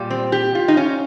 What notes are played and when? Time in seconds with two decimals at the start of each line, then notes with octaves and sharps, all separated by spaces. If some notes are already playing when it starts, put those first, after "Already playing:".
Already playing: A#2 G3
0.10 C4
0.32 G4
0.55 F4
0.68 D#4
0.77 C#4